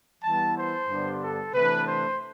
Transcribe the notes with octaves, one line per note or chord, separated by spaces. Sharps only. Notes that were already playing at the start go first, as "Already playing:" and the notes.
E3 G3 B3 E4 A5
C5
G2 D3 G3 B3 D4
A4
C3 E3 A3 D4 B4
C5